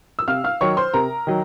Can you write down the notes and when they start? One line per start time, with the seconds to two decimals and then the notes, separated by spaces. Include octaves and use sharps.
0.19 E6
0.28 C3 F5 F6
0.44 F5 F6
0.61 D#3 F#3 C#5 C#6
0.77 C5 C6
0.94 C3 A#4 A#5
1.27 D#3 F#3